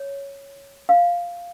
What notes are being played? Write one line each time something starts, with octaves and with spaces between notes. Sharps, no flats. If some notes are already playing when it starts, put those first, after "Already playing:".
Already playing: C#5
F5